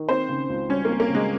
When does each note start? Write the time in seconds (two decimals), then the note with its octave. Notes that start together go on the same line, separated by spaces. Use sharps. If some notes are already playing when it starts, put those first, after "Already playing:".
Already playing: D#3
0.09 C4 C5
0.29 C#3
0.49 C#2
0.69 G3 C#4
0.85 A#3 C4
1.00 A#3
1.09 C#3
1.15 G#3